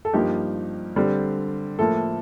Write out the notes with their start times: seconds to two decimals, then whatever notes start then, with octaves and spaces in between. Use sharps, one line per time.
0.05 A4
0.13 G2 F3 A#3 D#4 G4
0.96 D3 G3 C4
1.79 A2 F3 A#3 A4